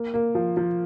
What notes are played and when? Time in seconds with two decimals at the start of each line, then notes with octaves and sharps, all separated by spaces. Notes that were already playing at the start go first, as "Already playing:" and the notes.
Already playing: A#3
0.14 A#3
0.35 F3
0.57 F3